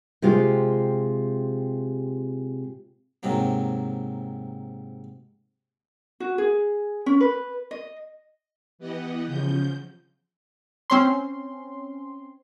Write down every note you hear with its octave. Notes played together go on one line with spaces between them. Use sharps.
C3 G#3 F4 G4 C5
G#2 C3 F#3 A#3
F#4
G#4
C#4
B4
D#5
E3 B3 G4 D#5 F#5
C#3 F3 G6
C4 C#4 C6